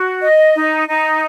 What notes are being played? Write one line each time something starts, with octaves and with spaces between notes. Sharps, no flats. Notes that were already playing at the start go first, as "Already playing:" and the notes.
Already playing: F#4
D#5
D#4
D#4